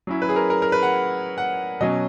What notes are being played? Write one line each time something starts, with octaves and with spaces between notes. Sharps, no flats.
F#3 C#4 E4
B4
G#4
A#4
A#4
A#4
B4
F#5
F#5
B2 F#3 C#4 D#5